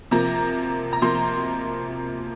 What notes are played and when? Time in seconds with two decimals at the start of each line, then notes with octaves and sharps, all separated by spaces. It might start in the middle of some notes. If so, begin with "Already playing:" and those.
0.11 C3 F3 A#3 A#5
0.93 A#5
1.02 C3 F3 A#3 C6